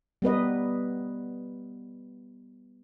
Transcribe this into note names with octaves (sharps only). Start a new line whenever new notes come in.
G3 B3 B4 D#5